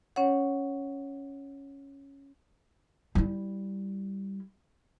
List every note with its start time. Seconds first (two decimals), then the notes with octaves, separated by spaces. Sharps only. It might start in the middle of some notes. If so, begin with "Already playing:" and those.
0.16 C#4 C#5 F#5
3.15 G3 E4